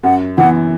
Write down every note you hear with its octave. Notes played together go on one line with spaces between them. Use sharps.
F#2 F#5
E3 B3 F#5